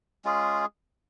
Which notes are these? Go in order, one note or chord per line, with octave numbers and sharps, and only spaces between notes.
G#3 C#4 F4 G#4